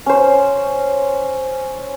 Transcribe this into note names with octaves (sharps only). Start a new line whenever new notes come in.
C#4 C5